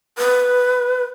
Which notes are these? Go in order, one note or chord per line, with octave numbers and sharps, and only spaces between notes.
B4